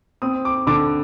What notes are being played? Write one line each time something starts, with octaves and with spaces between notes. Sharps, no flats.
C4 D#6
D6
D3 D6